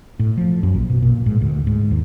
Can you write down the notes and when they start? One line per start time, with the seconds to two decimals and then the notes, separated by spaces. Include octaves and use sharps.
0.19 A2
0.37 F3
0.63 F#2
0.75 A#1
0.90 B2
1.02 A#2
1.26 G#2
1.41 D2
1.67 G#2
1.91 D#2